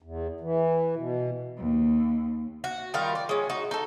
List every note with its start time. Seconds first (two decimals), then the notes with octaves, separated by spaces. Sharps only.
0.02 E2
0.41 E3
0.96 B2
1.57 D#2
2.64 F#4
2.94 D#3 G3 F4 A#4
3.15 D5
3.29 G#3 C#4
3.50 D#4 F#4
3.71 D#4 A4